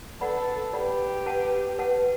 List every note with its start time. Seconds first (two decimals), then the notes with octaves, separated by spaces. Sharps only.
0.21 A4 B4 D5 F#5 B5
0.73 G4 B4 D5 F#5 B5
1.26 B4 F#5 A5
1.79 B4 F#5 A5